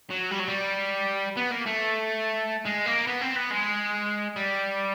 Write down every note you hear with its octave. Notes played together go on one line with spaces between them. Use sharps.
F#3
G3
F#3
G3
B3
A#3
A3
G#3
A#3
B3
C4
B3
G#3
G3